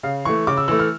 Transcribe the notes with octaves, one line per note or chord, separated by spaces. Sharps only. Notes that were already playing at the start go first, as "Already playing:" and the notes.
C#3 F5
E3 A3 C#6
C#3 D6
E6
E3 A3 E6
F6